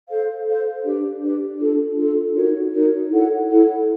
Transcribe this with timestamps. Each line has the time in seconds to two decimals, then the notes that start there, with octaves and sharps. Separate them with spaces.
0.08 A4 C5 F5
0.46 A4 C5 F5
0.84 D4 G4 B4 D5
1.21 D4 G4 B4 D5
1.59 D4 F4 A4
1.97 D4 F4 A4
2.34 D#4 F#4 A#4 C#5
2.73 D#4 F#4 A#4 C#5
3.09 E4 A4 C#5 F#5
3.48 E4 A4 C#5 F#5